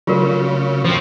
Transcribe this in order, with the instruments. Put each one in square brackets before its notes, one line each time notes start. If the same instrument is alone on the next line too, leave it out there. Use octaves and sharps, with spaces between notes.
[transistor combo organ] C#3 [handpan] F#3 A3 [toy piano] F4 F#4 A#4
[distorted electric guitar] F3 C4 [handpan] C5